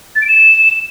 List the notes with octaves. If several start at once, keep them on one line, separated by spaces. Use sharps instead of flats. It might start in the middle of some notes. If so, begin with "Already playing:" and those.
A6
D7
E7